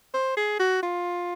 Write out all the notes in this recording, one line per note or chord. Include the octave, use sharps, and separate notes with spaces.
C5
G#4
F#4
F4